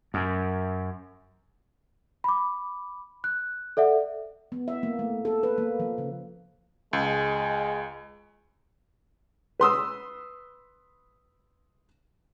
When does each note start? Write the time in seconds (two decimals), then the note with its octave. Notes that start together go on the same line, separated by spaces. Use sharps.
0.14 F#2
2.24 B5 D6
3.24 F#6
3.77 A4 D5 E5 F#5
4.52 B3
4.68 E5
4.83 A#3
4.99 A3
5.25 A4
5.43 B4
5.58 A#3
5.80 F3
5.98 C#3
6.93 C#2 G#3
9.60 B4 C6 D#6 E6